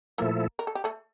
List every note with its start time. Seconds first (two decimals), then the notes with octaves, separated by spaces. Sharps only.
0.18 A#2 F3 A3 A#3 E4 A4 A#4
0.59 A#4
0.67 A4
0.75 G4
0.84 A3 A4